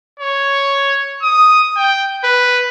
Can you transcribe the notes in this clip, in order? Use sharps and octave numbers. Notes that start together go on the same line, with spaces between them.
C#5
D#6
G5
B4